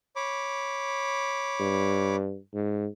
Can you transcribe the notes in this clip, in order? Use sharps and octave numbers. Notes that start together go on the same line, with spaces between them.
C#5 B5 D6
G2
G#2